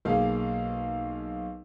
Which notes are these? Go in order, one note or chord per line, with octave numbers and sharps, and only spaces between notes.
B1 A#3 G#4 F5